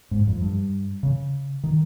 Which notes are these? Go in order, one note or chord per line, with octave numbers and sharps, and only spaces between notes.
G#2
F2
G2
C#3
D#3